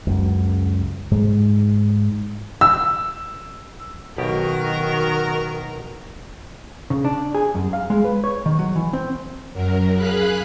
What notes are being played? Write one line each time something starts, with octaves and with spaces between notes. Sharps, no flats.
C#2 F#2
G#2 G#3
E6
B1 B2 D#3 F#4 G4 A#4
C#3
D4
G#4
F#2
F5
G#3
B4
C#5
D#3
F#3
E3
C4
F#2 F#3 A#4
G#4 F5 B5 F#6